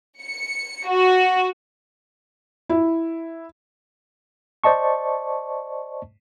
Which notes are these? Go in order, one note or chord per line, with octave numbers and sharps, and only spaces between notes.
C#7
F#4
E4
C5 D5 D#5 A5 C#6